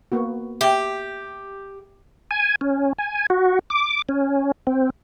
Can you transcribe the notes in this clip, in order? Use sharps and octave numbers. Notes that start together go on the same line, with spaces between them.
A#3 B3 F#4
G4 E5 G5
G#5
C#4
G#5
F#4
D6
C#4
C4